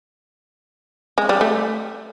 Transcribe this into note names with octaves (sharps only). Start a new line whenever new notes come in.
G#3
G3
A3